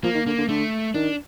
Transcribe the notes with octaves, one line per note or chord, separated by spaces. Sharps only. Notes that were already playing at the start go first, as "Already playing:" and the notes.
F3 A#3
D#3
D3 A#3
D3
D3 A3
D#3 D4